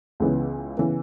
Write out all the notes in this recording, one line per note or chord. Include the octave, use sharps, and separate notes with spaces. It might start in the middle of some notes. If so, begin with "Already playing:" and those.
C#2 C#3 E3 B3
C#3 E3 B3